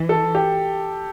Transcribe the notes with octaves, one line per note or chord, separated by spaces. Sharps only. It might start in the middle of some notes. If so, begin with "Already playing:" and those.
Already playing: E3
A4
G4